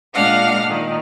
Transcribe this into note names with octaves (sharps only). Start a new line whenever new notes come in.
A#2 G#3 D4 F5 F#5 F6
A#2 D#3